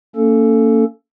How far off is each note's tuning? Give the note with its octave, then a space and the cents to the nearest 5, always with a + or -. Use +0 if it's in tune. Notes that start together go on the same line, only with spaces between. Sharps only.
A#3 -30 C#4 +25 A4 +0